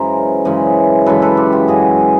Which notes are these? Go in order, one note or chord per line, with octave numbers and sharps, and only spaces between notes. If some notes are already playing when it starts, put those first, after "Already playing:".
Already playing: F#2 C#3 E3 G#3 A#4 C5
F#2 C#3 E3 G#3
F#2 C#3 E3 G#3 A4 B4
A4 B4
F4 G4
F4 G4
F#2 C#3 E3 G#3 F#4 G#4